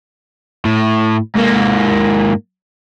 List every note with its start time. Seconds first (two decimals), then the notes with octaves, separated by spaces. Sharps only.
0.65 A2
1.36 G#2 A#3